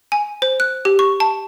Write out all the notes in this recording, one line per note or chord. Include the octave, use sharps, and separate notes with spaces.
G#5
C5
F#6
G4
C#6
A5